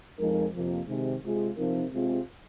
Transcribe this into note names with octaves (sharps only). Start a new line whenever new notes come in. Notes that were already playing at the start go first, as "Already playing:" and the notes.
F2 F3 G#3 D#4 A#4
F2 C3 F3 A#3
C3 D#3 G#3
C3 G#3 F4 G#4
C3 F3 C4 D#4 A#4
C3 G#3 C4 F4 G#4